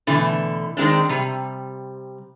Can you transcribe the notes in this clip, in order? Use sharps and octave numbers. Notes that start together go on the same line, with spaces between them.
B2 D3 E3 A3
D#3 G#3 C4 D4
C3 G3